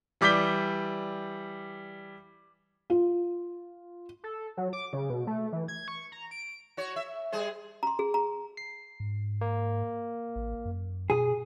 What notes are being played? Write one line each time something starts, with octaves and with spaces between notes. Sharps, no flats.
E3 G3 D6 G6 B6 G7
F4
A4
F#3
D6
C#3
B2
A3
E3
G#6
C#6
A#5
D7
F#4 C#5
E5
G3 G#4 C5
A#5 C6
G#4
A#5
C7
G#2
A#3
A1
F#2
B2 G#4